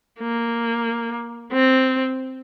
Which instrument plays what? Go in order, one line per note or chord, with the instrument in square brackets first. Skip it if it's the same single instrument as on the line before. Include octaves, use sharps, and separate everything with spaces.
[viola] A#3
C4